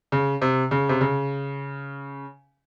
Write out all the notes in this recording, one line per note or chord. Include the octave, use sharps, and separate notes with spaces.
C#3
C3
C#3
C3
C#3